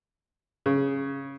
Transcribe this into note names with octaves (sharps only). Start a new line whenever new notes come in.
C#3